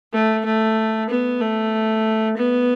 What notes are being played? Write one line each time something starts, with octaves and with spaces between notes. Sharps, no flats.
A3
A3
B3
A3
B3